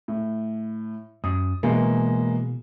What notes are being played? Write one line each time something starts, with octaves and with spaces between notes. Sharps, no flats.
A2
F#2 D#6
B2 E3 G#3 A#3